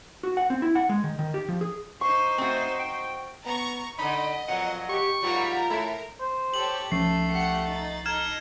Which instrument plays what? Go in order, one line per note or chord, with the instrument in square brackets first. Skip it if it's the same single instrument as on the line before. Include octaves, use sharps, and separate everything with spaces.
[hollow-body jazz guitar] F#4
F#5
C4
E4
F#5
G#3
D#3
D#3
G4
F3
G#4
[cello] D#4 C5 [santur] C#6
[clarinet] A3 [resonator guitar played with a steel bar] C4 F#4
[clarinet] G5
[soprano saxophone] B3 [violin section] A#5 C#6
[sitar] D3 D#4 [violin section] D#5 [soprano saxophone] B5
[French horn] F2 [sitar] A#2 F#3 [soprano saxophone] F#5
[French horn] G4 [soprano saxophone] C#6
[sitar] G#2 F#3 G3 [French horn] F4 [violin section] A#4 A#5
[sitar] A2 E4 [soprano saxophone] A3
[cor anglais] C5
[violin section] G4 A4 C#5 [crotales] F#7
[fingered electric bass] C2 F3 C#4 [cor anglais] A3 [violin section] A4 [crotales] C7
[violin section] G4 F#5 C#7
D#4 A6
[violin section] D#4 A4 A#5 [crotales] F6 G#6 E7